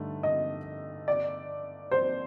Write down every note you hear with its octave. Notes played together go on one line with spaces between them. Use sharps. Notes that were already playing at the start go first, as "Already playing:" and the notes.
Already playing: G2 D3 A3 D#4 A4
D#5
D5
C5